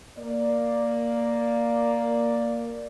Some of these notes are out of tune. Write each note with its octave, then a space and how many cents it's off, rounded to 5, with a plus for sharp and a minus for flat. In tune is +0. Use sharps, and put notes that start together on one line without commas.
A#3 +0 D5 +0